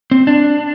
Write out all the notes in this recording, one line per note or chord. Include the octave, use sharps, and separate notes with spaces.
C4
D4